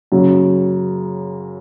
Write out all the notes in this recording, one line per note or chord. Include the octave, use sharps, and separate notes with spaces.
F#2 C#3 F#3